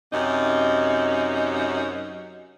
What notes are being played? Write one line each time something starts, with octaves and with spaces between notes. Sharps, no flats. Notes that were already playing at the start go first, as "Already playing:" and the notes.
F#2 C3 D#4